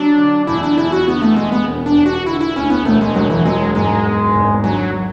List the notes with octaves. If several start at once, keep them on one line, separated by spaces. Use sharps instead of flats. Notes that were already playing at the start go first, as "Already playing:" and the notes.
Already playing: F#3 D4
D3
E2 E4
D4
E2 E4
F#4
D3 B3
A3
E2 G#3
B3
E1
D4
E1
F#4
D3 E4
E4
D2 C#4
B3
E1 A3
G#3
E1 F#3
E3
F#3 G#3
G#2 G#3
B3
G#1
D3 F#3